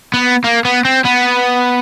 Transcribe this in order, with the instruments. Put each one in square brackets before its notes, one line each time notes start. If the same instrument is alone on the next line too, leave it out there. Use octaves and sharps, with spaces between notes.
[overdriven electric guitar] B3
A#3
B3
C4
B3